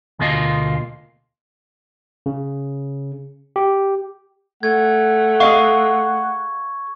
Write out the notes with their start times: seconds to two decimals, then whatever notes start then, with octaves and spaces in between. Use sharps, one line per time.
0.19 D2 B2 A#3 F4 D#5
2.26 C#3
3.56 G4
4.63 A3 F#5 G#6
5.40 G#4 D#5 F5 C#6